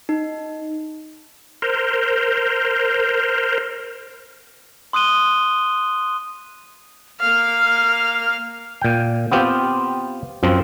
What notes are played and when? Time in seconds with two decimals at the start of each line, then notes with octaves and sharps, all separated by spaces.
0.09 D#4
1.62 A#4 C5
4.93 C6 D#6 F#6 D#7 G7
7.20 A#3 F5 F6
8.81 A#2 G5
9.32 B3 C4 F4 G4
10.43 F#2 F3 C4